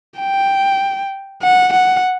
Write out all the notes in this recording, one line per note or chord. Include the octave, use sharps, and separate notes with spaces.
G5
F#5
F#5